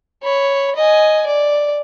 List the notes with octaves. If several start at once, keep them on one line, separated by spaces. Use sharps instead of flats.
C#5 B5
D#5 G#5
D5